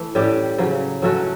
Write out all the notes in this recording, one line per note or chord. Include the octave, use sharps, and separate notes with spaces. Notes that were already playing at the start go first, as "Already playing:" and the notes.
Already playing: E3 A3
A2 G3 C#4 G4
C#3 F#3 C#4
F#3 A3 C#4 F#4